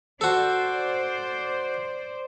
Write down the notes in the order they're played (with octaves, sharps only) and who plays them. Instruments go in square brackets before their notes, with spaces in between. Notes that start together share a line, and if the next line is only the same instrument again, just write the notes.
[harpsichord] F#4 A4 [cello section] C5 D5